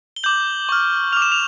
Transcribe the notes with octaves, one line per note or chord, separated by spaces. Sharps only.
G7
D6 G6 F#7
C#6 F6
D6 F6 F7
E7
F7